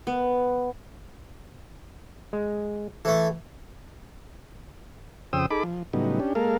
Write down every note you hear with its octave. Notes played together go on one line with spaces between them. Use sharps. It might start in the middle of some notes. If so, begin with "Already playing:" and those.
B3
G#3
E3 A3 A4
F2 C#3 C5 G5 D#6 E6
D#4 G#4 A4 B5 D6
F3
A2 C#3 F#3 G3 B3 D#4
C#4 D4 G4
G#3 A#3 A4 A#4 F5